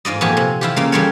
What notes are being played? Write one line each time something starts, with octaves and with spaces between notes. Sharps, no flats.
G#2 F4 D5 D#5
F2 A#2 B3 G4 C#5 G#5
C3
E4 F4 G4
C#3 A#3 F4
C#3 G3 A#3 F4 A4 C#5